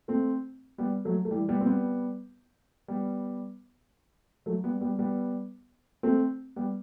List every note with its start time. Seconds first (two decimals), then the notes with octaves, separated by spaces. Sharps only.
0.08 A3 C4
0.78 G3 B3
1.05 F#3 A3
1.25 A3
1.31 E3 G3
1.49 G3 B3
1.61 C4
1.66 G3 B3
2.88 G3 B3
4.46 F#3 A3
4.64 G3 B3
4.81 G3 B3
4.99 G3 B3
6.03 A3 C4
6.56 G3 B3